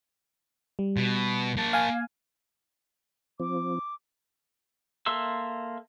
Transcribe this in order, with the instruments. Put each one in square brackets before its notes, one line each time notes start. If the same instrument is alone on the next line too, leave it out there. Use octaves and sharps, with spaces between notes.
[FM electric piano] G3
[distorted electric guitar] B2
A#3 A5
[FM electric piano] F5 G#5
[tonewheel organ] F3 C4 [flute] D6
[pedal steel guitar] A#3 A4 E5 C6 E6